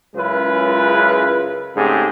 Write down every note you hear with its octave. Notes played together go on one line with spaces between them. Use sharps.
C#2 F#2 G#3 E4 F4 B4
G#2 C#3 A3 C4 G4 G#4